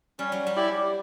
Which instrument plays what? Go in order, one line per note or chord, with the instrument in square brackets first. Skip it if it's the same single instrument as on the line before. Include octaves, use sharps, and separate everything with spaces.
[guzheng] G3 [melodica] C#4
[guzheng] F#3
G3
[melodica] E4 G4 D5